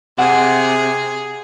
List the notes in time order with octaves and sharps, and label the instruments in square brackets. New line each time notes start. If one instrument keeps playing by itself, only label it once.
[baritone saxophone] C3 [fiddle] G#4 [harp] F#5 E6